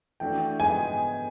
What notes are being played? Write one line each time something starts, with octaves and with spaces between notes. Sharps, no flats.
E3 A3 D4 F#4 G5
G#2 F3 G#3 B3 D#4 G#5